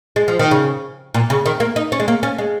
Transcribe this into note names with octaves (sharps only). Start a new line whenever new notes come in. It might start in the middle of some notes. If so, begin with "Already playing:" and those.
G#3
F3
D#3
C#3
A#2
C#3
D#3
A#3
D#4
C#4
G#3
A#3
C#4
G#3